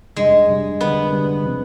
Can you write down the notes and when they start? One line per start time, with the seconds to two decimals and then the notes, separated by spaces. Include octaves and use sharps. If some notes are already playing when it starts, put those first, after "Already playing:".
0.16 F2 C3 G3 G#3 D4
0.48 F2 C3 G3 D4
0.81 D3 G3 B3 D4
1.12 D3 G3 D4
1.44 C3 F3 C4